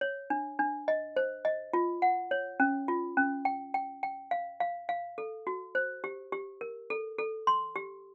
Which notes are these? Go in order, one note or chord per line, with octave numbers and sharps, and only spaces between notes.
C#5
D4
D4
D#5
C5
D#5
F4
F#5
C#5
C#4
F4
C#4
G5
G5
G5
F5
F5
F5
A4
F#4
C5
G4
G4
A#4
A4
A4
C6
G4